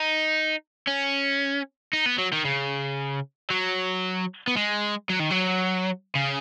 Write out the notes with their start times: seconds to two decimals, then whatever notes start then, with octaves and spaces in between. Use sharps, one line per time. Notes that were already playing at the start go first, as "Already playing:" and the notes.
Already playing: D#4
0.88 C#4
1.93 D#4
2.06 B3
2.18 F#3
2.33 D#3
2.45 C#3
3.50 F#3
4.47 B3
4.57 G#3
5.10 F#3
5.20 D#3
5.31 F#3
6.15 C#3